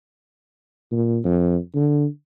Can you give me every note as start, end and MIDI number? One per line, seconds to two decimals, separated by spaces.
0.92 1.19 46
1.25 1.57 41
1.75 2.06 50